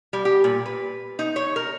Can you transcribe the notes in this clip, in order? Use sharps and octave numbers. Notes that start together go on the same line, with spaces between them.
G3
G4
A#2
B4
D#4
C#5
A#4